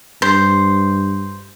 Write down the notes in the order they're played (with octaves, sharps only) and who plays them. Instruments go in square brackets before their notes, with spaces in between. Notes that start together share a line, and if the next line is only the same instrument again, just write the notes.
[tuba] G2 [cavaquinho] C5